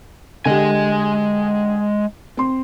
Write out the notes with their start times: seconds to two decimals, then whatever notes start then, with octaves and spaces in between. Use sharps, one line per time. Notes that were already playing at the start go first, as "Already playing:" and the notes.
0.45 D3 G#3 G4 G#5
2.37 C4 C6